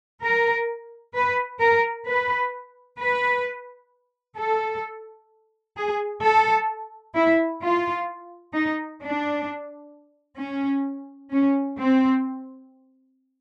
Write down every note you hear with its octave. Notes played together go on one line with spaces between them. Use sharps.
A#4
B4
A#4
B4
B4
A4
G#4
A4
E4
F4
D#4
D4
C#4
C#4
C4